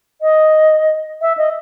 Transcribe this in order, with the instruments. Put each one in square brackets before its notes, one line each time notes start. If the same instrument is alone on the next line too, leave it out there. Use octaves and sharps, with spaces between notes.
[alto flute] D#5
E5
D#5